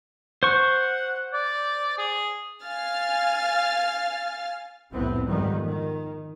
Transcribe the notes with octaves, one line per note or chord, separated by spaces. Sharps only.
C5 F#5 C#6
D5
G#4
F5 G#5 F6 A6
C2 F2 A2 B3 C4
F2 G#2 D#3 G3 B3
D#3